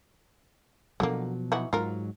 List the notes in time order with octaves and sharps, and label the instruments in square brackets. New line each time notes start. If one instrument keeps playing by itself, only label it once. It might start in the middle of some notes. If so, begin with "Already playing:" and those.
[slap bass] B2 F3 F#3 [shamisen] D3 A#3
[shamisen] E3 D#4 F#4
[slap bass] G#2 F#3 [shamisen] F4 A#4